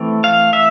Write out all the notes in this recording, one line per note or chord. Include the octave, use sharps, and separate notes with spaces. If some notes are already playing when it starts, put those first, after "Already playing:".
Already playing: E3 A3 C4
F5
E5